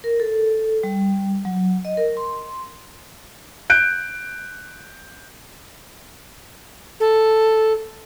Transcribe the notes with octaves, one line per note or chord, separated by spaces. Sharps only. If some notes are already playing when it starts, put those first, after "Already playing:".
A#4
A4
G3
F#3
D#5
A#4
C6
F#6 G6 D7
A4